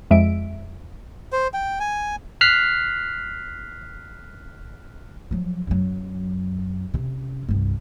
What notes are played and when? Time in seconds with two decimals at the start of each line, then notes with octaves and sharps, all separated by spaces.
0.11 F2 G#3 E5 D7
1.33 C5
1.54 G5
1.80 G#5
2.41 F6 F#6 B6 C7
5.31 F3 F#3
5.67 F#2 F#3
6.94 C3 C#4
7.49 C2 G2